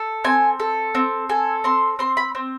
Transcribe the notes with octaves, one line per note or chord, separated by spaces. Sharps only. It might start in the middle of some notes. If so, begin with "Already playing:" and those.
Already playing: A4
C4 G#5
A4
C4
A4 G#5
C4 C6
C4 C6
B5
C4